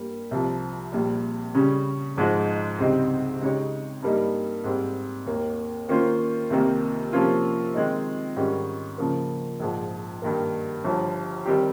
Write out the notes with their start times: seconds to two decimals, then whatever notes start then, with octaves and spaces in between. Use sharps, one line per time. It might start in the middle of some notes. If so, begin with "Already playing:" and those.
Already playing: G2 G3 A#3
0.31 C2 C3 F3
0.92 A#1 A#2 G3
1.55 C#3 G3 C#4
2.17 G#1 G#2 F3 G#3 D#4
2.78 C#2 C3 G3 C4 D#4
3.41 C#3 G#3 D#4 G4 C#5
4.03 G2 G3 A#3 D#4
4.64 G#2 G3 C4
5.26 D#2 D#3 A#3
5.89 D#3 A#3 C#4 F4 C5
6.50 C2 C3 D#3 A#3
7.13 C3 F3 A#3 C#4 F4
7.74 D#3 G#3 C4 D#4
8.36 G#2 D#3 G3 C#4
8.98 C#3 F3 A#3
9.60 A#1 G#2 F3
10.22 G2 D#3 A#3
10.84 G1 G2 F3
11.46 D#3 G3 C4 G4